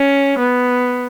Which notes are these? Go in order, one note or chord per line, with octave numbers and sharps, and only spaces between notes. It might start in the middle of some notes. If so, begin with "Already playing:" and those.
Already playing: C#4
B3